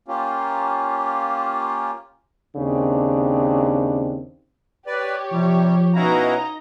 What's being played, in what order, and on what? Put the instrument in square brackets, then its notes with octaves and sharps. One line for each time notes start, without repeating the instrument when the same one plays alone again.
[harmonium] A#3 C#4 F4 G4
[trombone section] D#2 C#3 C4 D4
[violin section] G4 C#5 [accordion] B4 D5
[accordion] C3 G3 [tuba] F3
[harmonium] B2 C#4 F5 [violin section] D#4 D#5 A#5 [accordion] E4 F#4